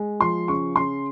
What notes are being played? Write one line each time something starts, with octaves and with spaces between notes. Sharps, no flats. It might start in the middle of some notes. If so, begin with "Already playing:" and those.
Already playing: G#3
F3 C6
C#3 C#6
C#3 C6